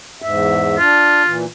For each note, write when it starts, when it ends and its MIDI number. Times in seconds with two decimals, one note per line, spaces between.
0.22 0.77 40
0.22 0.77 44
0.22 0.77 76
0.79 1.22 62
0.79 1.36 65
1.26 1.45 46
1.26 1.45 52